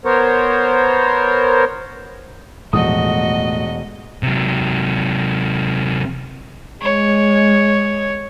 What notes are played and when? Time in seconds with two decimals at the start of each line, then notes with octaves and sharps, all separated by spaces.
0.05 B3 A#4 C5 C#5
2.73 E1 A2 F3 A3 F#4 D#5 D#6
4.23 C3 F#3
6.82 G#3 C#5